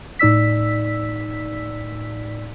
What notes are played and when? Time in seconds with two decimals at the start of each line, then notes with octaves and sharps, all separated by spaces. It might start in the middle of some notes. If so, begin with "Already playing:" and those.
0.19 A2 D#4 D5 E6 B6